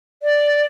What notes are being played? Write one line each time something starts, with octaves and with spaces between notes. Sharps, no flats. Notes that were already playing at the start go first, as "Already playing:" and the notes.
D5